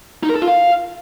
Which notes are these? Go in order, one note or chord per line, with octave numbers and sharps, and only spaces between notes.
D#4
A#4
A4
F4
F5